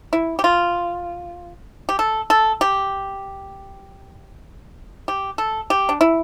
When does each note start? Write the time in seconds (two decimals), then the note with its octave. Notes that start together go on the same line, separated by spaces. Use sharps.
0.13 E4
0.39 G4
0.44 F4
1.89 G4
1.99 A4
2.30 A4
2.61 G4
5.08 G4
5.38 A4
5.70 G4
5.89 D4
6.01 E4